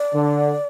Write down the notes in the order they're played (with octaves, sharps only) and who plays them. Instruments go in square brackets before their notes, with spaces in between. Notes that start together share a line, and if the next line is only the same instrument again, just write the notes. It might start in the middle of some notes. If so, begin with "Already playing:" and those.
Already playing: [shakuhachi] D5
[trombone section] D3